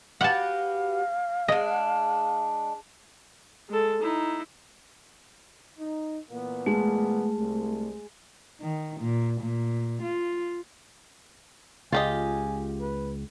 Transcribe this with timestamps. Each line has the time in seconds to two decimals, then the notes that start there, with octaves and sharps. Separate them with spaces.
0.21 F#4 G4 B4 F5 F#5 A5
1.48 G#3 D4 D#5
3.69 G#3 A4
4.02 D#4 E4
5.79 D#4
6.31 A#2 E3 B3
6.66 G#3 A3
7.37 C2
8.61 D#3
9.01 A#2
9.41 A#2
10.03 F4
11.92 C#2 F4 G4 D#5 G#5
12.80 B4